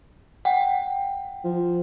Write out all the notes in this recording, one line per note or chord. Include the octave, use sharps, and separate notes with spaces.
F#5 G5
F3